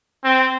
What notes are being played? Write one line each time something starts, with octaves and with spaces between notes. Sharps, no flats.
C4